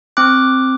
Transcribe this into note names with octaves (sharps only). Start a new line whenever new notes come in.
C4 D6 F#6